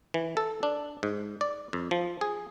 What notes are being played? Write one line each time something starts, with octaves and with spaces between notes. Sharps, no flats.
E3
A4
D4
G#2
D5
F2
F3
G#4